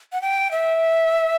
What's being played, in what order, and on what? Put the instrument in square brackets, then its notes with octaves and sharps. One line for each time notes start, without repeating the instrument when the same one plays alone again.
[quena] F#5
G5
E5